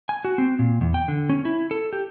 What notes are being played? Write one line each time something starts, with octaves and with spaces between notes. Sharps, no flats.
G#5
F#4
C4
A#2
E2
G5
D3
C#4
E4
A4
G4